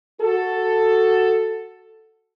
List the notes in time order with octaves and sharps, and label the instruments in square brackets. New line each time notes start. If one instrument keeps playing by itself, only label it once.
[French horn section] F#4 A4